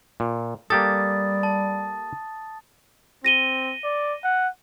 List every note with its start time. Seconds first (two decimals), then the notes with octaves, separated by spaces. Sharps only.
0.20 A#2
0.70 G3 A#3 G4 A4 D#6 A6
1.43 A5
3.25 C4 A#6 D#7 G7
3.84 D5
4.24 F#5